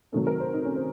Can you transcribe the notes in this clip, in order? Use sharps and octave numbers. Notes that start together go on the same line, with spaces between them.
C3 D#3 F#3 A4
A#4
C5
D#4
C#4
C5